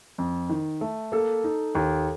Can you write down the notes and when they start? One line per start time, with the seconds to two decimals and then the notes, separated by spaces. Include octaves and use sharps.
0.18 F2
0.49 D#3
0.81 A3
1.12 A#3 A4
1.44 D#4
1.75 D#2